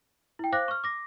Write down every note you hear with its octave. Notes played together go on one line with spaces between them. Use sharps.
E4 G5
C5 F5 D6 F#6 A#6
C#6 F6
D6 A#6